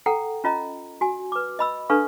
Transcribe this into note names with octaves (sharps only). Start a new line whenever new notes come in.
A4 F#5 G5 A#5
C#4 F4 D#5 A#5
F#4 G#5
B4 D6
D#5 B5 E6
D4 A4 B4 F5 C#6